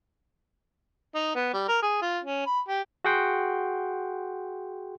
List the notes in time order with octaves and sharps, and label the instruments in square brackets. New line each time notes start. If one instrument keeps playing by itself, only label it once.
[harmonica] D#4
B3
G3
A#4
G#4
F4
C#4
B5
G4
[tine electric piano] F#4 G#4 F#5 G5 C6